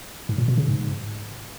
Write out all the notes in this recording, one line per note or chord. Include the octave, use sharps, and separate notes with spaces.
G#2
A#2
B2
C#3
G#2